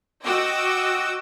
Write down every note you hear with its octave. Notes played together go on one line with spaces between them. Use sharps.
F#4 D#5 G5 D6 E6